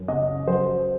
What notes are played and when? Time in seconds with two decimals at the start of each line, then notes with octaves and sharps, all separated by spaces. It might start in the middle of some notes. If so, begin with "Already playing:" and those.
Already playing: F#2
0.08 C#3 D#5
0.47 F#3 C5